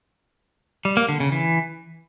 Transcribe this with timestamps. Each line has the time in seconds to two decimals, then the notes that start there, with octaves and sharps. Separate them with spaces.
0.85 G3
0.97 A#3
1.09 D3
1.20 C#3
1.32 E3